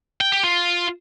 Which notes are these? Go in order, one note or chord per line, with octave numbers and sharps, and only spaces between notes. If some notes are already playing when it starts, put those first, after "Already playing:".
G5
G4
F4